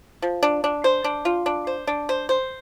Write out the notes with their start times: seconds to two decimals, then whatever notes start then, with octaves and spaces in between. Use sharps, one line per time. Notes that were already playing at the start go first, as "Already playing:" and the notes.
0.22 F3
0.43 D4
0.64 D4
0.84 C5
1.04 D4
1.25 F4
1.46 D4
1.67 C5
1.87 D4
2.09 C5
2.29 C5